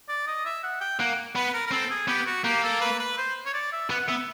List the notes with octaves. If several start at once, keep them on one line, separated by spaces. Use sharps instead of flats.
D5
D#5
E5
F#5
G5
A#3 F#5
B3 B4
A#4
A#4
C4 A4
G#4
B3 G4
F#4
A#3 G4
A4
B4
B4
C5
C#5
D5
E5
B3 F#5
B3 E5